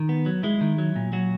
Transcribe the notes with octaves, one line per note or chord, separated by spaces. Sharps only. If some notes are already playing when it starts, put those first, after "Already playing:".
Already playing: D#3
B3
F#3
G#3 E4
D#3
F#3
A#2
F#3 F#4